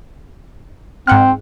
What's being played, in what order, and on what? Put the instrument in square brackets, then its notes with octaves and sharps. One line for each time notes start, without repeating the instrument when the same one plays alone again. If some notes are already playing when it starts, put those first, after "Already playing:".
[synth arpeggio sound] G#2 F#5 F6 [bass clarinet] C4